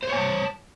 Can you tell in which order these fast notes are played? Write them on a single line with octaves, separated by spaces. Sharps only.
C5 C#5 G#5 A5